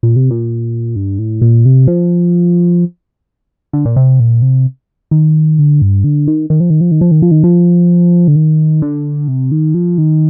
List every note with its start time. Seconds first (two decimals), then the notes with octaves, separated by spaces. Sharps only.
0.03 A#2
0.16 C3
0.31 A#2
0.96 G2
1.19 A2
1.41 A#2
1.66 C3
1.87 F3
3.73 D3
3.85 A#2
3.96 C3
4.20 A#2
4.42 C3
5.11 D#3
5.59 D3
5.82 G2
6.04 D3
6.27 D#3
6.50 D#3
6.60 F3
6.70 D#3
6.81 F3
6.91 D#3
7.01 F3
7.11 D#3
7.22 F3
7.31 D#3
7.44 F3
8.28 D3
8.36 D#3
8.82 D3
9.28 C3
9.52 D#3
9.74 F3
9.98 D#3